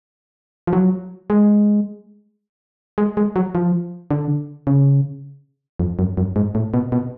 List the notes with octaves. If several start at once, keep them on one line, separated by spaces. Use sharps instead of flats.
F3
F#3
G#3
G#3
G#3
F#3
F3
D3
C#3
F2
F#2
F#2
G#2
A2
B2
B2